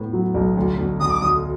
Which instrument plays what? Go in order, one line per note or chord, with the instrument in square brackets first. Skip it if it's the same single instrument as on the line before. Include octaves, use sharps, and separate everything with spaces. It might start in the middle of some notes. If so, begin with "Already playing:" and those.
Already playing: [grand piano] A2 B3
F#3
B1
D2
D2
[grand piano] D2 [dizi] D#6
[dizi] D6
[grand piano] D2 [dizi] D#6